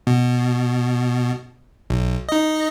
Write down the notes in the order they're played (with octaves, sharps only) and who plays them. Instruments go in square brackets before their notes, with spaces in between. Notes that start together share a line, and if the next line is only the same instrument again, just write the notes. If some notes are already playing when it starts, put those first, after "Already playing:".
[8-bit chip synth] B2
B1
D#4 D#5